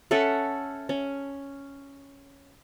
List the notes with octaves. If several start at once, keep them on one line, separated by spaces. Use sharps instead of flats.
C#4 A4 E5 F#5
C#4